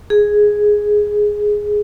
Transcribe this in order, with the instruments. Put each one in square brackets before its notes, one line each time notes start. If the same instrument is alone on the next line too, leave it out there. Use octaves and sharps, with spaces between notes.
[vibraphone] G#4